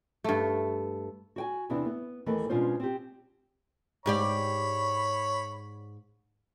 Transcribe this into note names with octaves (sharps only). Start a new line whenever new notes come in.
G2 A3
F#4 G5 G#5
E2 C3 B3 D4 E4
B3
D#2 E3 A3 A#4 B4 D#5
B2 G#3 C#4 D4 F4 C5
C4 G4
G#2 G4 C#5 D5 B5